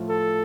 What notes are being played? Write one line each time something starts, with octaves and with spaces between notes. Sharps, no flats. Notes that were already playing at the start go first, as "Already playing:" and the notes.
Already playing: A2 F3 A3 F4
A4